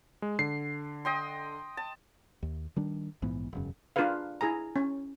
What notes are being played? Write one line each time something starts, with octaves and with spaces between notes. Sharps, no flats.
G#3
D3 C7
D#5 G5 C6
A5
D#2
D#3 G3 D4
A#1 G#2 E3 B3
E1 F#2 C#3
D4 F4 G#4 A#4 B4 F5
E4 G#4 G#5 A#5
C#4